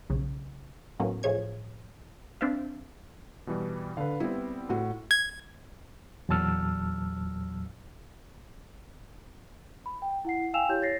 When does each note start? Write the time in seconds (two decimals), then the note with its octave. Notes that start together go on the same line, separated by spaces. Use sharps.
0.10 B1 C#3
1.00 A2 F#3 A#3 B3 C#4
1.23 A2 F3 G#4 C#5 G#6
2.41 C4 D4 C5 E5 F5
3.47 B2 E3 G3
3.97 D3 B4 F5
4.20 G3 B3 C4 E4
4.69 A2 F#4
5.11 G#6
6.29 E2 A#2 F#3 A5 E6 F6
9.86 B5
10.02 G5
10.25 E4 F#5 C7
10.54 F5 G5 G#5 E6 E7 F7
10.69 E4 G4 C#5 G6
10.82 C#5 A6 A#6 C7